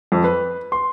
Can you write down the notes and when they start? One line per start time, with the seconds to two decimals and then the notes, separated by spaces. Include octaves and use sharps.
0.12 F2
0.24 B4
0.72 C6